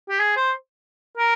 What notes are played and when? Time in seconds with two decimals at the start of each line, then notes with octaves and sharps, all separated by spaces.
0.09 G4
0.20 G#4
0.36 C5
1.17 A#4